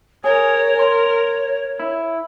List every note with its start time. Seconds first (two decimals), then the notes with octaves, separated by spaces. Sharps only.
0.24 G#4 A#4 C#5
0.79 C#5 C6
1.80 E4